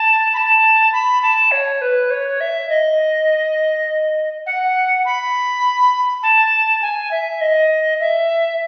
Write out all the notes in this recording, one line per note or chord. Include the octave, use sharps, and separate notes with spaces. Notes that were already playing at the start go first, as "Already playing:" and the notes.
Already playing: A5
B5
A5
B5
A5
C#5
B4
C#5
E5
D#5
F#5
B5
A5
G#5
E5
D#5
E5